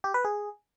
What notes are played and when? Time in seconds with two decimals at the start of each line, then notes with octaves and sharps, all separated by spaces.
0.04 G4
0.14 B4
0.25 G#4